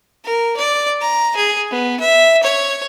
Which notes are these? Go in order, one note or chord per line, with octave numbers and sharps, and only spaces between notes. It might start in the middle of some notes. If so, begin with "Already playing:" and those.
A#4
D5
A#5
G#4
B3
E5
C#5